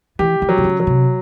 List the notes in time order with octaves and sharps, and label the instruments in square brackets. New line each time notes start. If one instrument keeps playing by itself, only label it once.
[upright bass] E3 [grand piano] G4
[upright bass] D#3
[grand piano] F#3
[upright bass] C3
C#3
[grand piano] F#3
[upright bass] C3